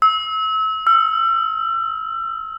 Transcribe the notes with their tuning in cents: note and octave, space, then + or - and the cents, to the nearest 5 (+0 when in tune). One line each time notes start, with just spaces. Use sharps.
E6 -30
E6 +35